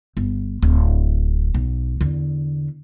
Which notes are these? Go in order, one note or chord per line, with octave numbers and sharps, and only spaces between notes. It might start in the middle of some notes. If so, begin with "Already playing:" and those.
G1
D1
B1
E2 D3